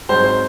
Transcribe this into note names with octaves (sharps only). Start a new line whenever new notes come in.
G#2 F#3 C4 C5
C5